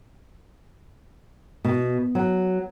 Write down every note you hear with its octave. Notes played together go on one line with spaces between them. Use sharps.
B2
F#3